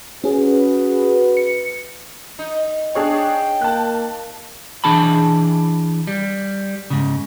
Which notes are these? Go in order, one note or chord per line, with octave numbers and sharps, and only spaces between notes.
C#4 F#4 G#4 B4
C#7
D#4
D4 G#4 C#5 G5
A#3 A5 F#6
E3 D4 G#4 A5 B5
G3
G#2 C#3